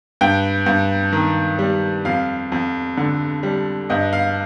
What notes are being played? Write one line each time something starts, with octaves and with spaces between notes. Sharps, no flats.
G2 G5
G2
D#3
G3
F2 F5
F2
D3
G3
G2 D#5
F5